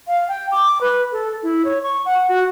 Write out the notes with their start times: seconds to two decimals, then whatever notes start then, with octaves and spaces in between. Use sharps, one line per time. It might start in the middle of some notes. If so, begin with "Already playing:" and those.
0.07 F5
0.29 G5
0.52 D6
0.81 B4
1.12 A4
1.43 E4
1.65 C#5
1.83 C#6
2.05 F#5
2.29 F#4